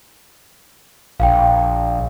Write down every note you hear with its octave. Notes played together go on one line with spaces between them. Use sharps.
A#1 F5 G5